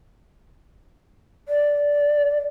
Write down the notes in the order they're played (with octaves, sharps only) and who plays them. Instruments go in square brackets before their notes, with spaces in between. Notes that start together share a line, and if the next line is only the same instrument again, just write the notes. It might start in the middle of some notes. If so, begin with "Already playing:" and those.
[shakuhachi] D5